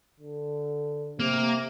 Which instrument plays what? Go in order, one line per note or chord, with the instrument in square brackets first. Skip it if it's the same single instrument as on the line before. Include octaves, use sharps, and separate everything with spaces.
[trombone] D3
[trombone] C3 [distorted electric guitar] A#3